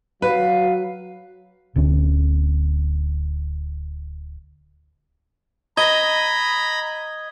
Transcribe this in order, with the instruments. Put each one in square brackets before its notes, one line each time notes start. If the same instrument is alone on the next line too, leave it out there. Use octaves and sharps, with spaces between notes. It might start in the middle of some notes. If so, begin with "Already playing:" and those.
[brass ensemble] F#3 [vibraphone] F#4 [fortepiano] B4 [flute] F5
[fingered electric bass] D1 D2 C#4
[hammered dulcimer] D#5 [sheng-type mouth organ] A#5 B5 [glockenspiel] G#6 G7